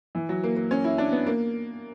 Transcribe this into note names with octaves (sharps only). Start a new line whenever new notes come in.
E3
F#3
A#3
A#3
C#4
E4
D4
B3
A#3